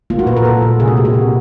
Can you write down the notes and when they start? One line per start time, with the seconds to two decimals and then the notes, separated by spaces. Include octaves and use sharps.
0.10 A#3 F4
0.19 F#4
0.27 A#2 B4
0.37 A#4
0.44 A#2 A4
0.62 A#3
0.80 C3 G#4
0.88 F#4
0.97 A#3 G4
1.05 F#4
1.14 C3